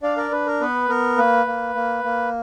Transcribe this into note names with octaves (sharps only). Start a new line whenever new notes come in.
D4 D5 F5
A#4 D5
D4 B4
A#4
B3 B4
B3 A#4
A#3 B4
A#3
A#3
A#3